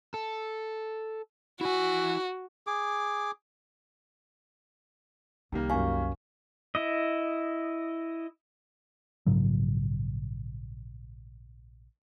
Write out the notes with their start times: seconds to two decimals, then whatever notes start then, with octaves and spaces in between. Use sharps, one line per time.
0.14 A4
1.61 E4 F#4 G#5
2.67 G#4 D6
5.52 C2 D#3 G3 A#3
5.70 F#2 F5 G#5 C#6
6.75 E4 D#5
9.26 A#1 G#2 C#3 F#3